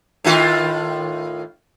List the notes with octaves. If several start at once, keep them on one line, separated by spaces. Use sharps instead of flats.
A2 D#3 F4